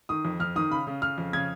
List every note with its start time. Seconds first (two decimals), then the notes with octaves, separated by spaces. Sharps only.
0.09 D#3 D#6
0.25 F2
0.40 F2 F6
0.56 D#3 D#6
0.71 C#3 B5
0.87 C#3
1.02 C#3 F6
1.18 F2
1.33 C#3 G#6